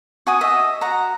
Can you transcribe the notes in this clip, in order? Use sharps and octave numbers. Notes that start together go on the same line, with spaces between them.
F#4 G#5 D#6
D#5 E5
F#4 F#5 A#5